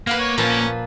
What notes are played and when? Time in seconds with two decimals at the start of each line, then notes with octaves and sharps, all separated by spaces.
0.07 A#3 B4 F5 F#5
0.19 C#5
0.38 A#2 F3 C#4 B4